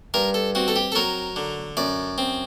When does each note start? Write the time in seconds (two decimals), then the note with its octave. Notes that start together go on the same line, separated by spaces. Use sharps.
0.14 G2 A#4
0.34 A4
0.55 C4 F#4
0.68 A4
0.76 G4
0.92 A4
0.95 F#3 A#4
1.36 D3
1.77 F#2 D5
2.18 C4